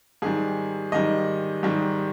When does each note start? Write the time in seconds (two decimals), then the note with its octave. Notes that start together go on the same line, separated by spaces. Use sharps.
0.22 G#2 D#3 G3 G#4
0.92 G#2 D#3 G3 D#5
1.63 G#2 D#3 G3